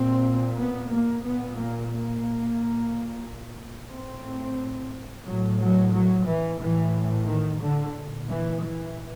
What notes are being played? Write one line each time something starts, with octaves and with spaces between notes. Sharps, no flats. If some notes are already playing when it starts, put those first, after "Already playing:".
Already playing: A#2 C4
B3
A#3
A#2 B3
A#3
A#3
A#2
A2 C4
A2 F#3
F#3
F#3
E3
A2 E3
D#3
D3
A#2
E3
E3